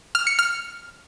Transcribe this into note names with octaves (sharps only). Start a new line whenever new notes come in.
F6
C#7
F6